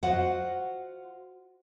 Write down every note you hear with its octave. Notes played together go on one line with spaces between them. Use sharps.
F4 F#4 C5 D#5 F5 F#5